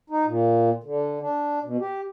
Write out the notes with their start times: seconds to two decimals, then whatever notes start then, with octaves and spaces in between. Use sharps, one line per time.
0.10 D#4
0.26 A#2
0.84 D3
1.21 D4
1.64 B2
1.80 G4